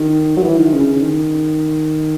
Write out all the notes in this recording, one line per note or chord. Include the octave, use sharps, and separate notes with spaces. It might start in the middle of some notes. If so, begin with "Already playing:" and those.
Already playing: D#3
F#3
E3
D#3
C#3
C#3
D#3